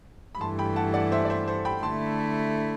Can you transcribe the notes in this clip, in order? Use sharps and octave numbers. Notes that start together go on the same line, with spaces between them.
B5
G2 E3 A3 A5 C6
G5 B5
F#5 A5
D5 F#5
C5 E5
D5
C5 E5
A4 C5
G5 B5
D3 A3 E4 A5 C6